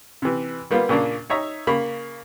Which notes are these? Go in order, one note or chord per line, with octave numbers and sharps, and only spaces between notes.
C3 E3
G3 A#3 B3 F4
A#2 C#3 A#3 D4
D#4 C#5 E5 A#5
C#3 A#3 B5